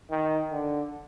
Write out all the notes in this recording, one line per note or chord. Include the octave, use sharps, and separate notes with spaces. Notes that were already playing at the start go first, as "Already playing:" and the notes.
D#3
D3